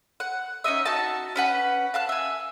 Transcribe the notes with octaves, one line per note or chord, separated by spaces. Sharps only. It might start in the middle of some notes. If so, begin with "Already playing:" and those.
F#5
C#4 D#4 D#5 E5
D#4 F#4 E5 A5
C#4 B4 F#5
F5 A5 F#6
E5 G#5